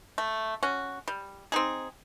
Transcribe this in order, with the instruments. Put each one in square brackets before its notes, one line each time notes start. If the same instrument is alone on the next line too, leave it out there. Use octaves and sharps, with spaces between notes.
[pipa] A3
C#4 F#4
G3
C4 D#4 G#4